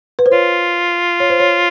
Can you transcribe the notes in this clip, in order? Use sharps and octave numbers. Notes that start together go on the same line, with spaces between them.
B4
C5
F4 C#5
C#5
C5
C#5